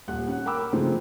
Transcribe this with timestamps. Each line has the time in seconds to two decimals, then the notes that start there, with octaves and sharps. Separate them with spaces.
0.08 D#1 F#5 F#6
0.27 C#4 F#5
0.46 A#4 G5 B5 D6 E6
0.73 C#3 E3 F3 G#3 A3 C4